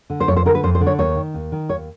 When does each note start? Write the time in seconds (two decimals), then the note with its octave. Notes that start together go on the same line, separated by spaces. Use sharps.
0.10 D3
0.20 C5
0.28 F2 C#5
0.37 C5
0.45 D3 A#4
0.55 B4
0.63 F2 C5
0.75 C5
0.81 D3
0.87 C#5
0.99 D#2 C#5
1.16 D#3
1.34 D#2
1.52 D#3
1.69 D#2 C#5